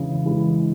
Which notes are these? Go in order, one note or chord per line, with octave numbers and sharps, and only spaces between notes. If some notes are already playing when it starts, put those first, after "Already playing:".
Already playing: C#3 E3 G#3 E4
E3 G#3 E4